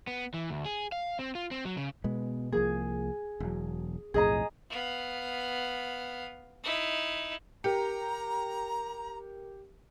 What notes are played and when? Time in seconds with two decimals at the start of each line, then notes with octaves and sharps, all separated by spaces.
0.07 B3
0.34 E3
0.50 D2
0.65 G#4
0.92 F5
1.19 C4
1.35 F4
1.51 C4
1.65 F#3
1.77 C#3
2.04 B2 G#3 B3
2.52 C2 F3 A#3 G#4
3.40 E1 F#3
4.14 B1 F2 A2 G#4 D#5 A#5
4.70 B3 F5
6.64 D#4 E4
7.64 G4 A#4 A#5 C#7